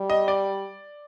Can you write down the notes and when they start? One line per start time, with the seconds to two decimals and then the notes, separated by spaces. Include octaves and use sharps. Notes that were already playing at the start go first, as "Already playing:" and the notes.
Already playing: G3
0.10 D#5
0.28 D5